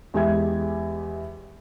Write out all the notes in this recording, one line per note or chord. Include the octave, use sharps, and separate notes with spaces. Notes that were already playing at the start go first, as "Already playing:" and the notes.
E2 G#3 G4 E5 G#6